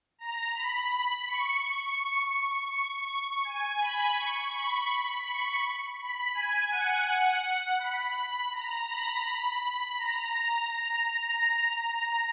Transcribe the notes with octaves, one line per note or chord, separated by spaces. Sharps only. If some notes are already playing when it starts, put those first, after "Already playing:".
A#5
B5
B5
C#6
C#6
G#5
B5
C#6
B5
C#6
B5
G#5
F#5
F#5
B5
B5
A#5
B5
B5
A#5